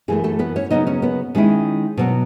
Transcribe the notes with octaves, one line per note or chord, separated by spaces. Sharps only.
F#2 E3 A3 G#4
A3 A4
B3 B4
C#4 C#5
C#3 F#3 B3 D#4 D#5
C#4 C#5
B3 B4
D#3 G#3 C#4 E4
B2 F#3 B3